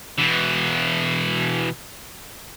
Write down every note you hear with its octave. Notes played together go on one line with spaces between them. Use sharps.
B2 E3